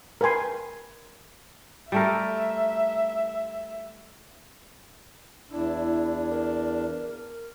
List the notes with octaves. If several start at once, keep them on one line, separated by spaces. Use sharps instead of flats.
A#4 B4 G5 G#5 C6
G3 A3 A#4 E5
E2 D4 E4
A#4